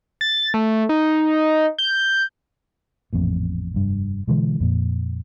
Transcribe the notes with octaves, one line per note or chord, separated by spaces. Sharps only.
A6
A3
D#4
G6
A1 F2 A#2
F1 G2
B2 D3 E3 G#3
F2 A#2